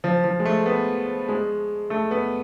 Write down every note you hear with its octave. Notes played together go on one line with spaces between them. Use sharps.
F3
F3
G#3
A3
B3
G#3
A3
B3